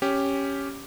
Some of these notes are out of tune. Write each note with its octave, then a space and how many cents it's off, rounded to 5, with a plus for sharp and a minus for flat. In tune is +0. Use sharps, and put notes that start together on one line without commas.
C#4 +0 G4 +0